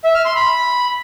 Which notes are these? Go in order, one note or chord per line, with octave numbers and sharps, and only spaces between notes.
E5
F6
C6
B5